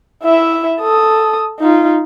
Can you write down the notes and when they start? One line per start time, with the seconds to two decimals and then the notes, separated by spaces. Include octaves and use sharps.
0.24 E4 E5
0.80 A4 D#6
1.60 D#4 F4